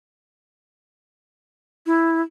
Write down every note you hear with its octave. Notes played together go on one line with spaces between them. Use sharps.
E4